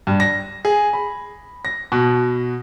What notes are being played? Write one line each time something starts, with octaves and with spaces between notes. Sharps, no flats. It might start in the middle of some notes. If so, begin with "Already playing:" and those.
G2
A#6
G#4
B5
A#6
B2